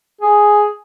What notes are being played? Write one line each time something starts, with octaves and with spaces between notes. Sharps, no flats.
G#4